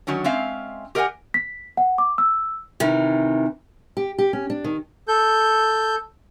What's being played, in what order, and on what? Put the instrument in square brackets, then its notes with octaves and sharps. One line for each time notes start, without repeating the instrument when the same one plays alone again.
[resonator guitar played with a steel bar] D#3 F#3 C#4 D4
G#3 C4 C#4 E5 F5
G4 A#4 D#5 E5 F#5 G#5
[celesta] B6
F#5
D6
E6
[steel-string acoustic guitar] C3 D#3 E3
G4
G4
C#4
D4
D#3
[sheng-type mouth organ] A4 G6